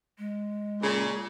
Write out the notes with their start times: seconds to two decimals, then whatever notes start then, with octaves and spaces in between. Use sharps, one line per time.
0.18 G#3
0.82 A#2 C#3